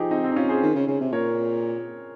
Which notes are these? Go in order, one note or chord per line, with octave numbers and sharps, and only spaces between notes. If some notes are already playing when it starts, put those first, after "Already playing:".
Already playing: F3 D#4 G4 G#4
C4 D#4
C4
D#4
C#4 F4
G#4 C5
D#3
C#3
C#3
C3
A#2 A#4 C#5